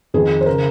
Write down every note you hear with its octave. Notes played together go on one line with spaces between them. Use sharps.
F2 D#3 G#4
C5
C#3 A#4